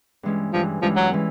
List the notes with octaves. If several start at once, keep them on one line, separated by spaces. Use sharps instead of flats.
G2 E3 G#3 C#4
G2 E3 F3 G#3 C#4
G2 E3 F3 G#3 C#4
F#3
E3 G#3 C#4